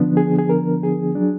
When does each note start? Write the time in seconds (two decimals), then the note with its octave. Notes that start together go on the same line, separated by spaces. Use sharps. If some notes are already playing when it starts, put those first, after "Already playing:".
Already playing: D3 F3 B3 D4
0.17 G#4
0.39 G#4
0.49 A#4
0.83 G#4
1.15 F#3 D4